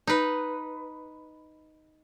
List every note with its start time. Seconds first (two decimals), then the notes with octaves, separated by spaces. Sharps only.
0.07 D#4 B4